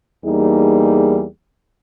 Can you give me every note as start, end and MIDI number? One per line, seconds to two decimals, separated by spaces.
0.25 1.24 40
0.25 1.24 55
0.25 1.24 58
0.25 1.24 63
0.25 1.24 68